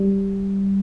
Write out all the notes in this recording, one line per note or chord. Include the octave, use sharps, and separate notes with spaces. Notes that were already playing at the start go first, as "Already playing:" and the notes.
Already playing: G3